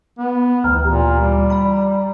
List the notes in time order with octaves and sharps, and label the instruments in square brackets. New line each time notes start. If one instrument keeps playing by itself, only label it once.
[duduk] B3
[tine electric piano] D2 E3 [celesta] G5 A#5 F6
[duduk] A#2 [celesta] G4
[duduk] G3
[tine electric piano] D5 G5 B5 [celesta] A#5